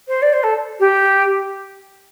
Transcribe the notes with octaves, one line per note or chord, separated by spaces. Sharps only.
C5
D5
C5
A4
G4